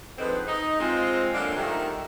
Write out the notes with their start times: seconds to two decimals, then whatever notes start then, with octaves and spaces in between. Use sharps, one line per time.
0.18 D3 F3 G#3 C4 D#4 B4
0.47 D#4 D#5
0.80 G#3 C4 F4
1.34 D3 F#3 A3 A#3 D4 F4
1.56 D#3 G3 A3